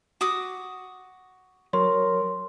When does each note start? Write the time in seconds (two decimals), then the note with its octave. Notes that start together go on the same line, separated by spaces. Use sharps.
0.21 F#4 D6 D#6
1.73 F#3 A#4 C#5 C6